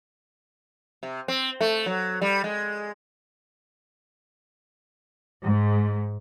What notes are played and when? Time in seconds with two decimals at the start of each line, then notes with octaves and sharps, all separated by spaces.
1.03 C3
1.28 C4
1.61 A3
1.86 F#3
2.22 G3
2.44 G#3
5.43 G#2